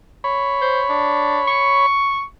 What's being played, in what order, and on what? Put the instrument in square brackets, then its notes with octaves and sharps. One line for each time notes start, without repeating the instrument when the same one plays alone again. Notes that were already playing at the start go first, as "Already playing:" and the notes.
[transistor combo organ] C#5 B5
[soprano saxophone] C5
D4
C#6